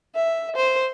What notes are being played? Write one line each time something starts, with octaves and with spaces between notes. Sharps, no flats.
E5
C5